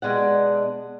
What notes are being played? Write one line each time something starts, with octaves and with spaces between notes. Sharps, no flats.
B2 G#3 D4 F#5